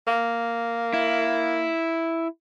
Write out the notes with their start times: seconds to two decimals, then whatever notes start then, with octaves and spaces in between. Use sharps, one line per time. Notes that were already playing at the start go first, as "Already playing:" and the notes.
0.08 A#3
0.93 E4